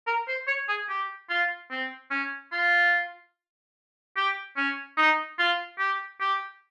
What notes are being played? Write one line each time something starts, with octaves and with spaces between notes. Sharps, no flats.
A#4
C5
C#5
G#4
G4
F4
C4
C#4
F4
G4
C#4
D#4
F4
G4
G4